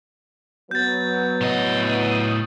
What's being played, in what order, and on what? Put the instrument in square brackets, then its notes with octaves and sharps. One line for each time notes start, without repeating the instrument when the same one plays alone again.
[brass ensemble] F#3 B3 [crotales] G6 A6
[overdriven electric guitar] A2 D#5